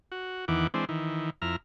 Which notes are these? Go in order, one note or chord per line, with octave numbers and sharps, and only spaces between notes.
F#4
E2 D#3 E3 F#5 D6
E3 G#3 C4 D4
D#3 E3
F2 E4 A#5 F6